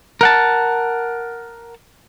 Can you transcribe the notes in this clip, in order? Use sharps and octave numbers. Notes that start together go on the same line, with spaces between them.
A#4 F#5 A5